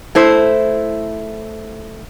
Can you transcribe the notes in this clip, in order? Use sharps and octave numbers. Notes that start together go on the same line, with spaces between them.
A3 E4 C5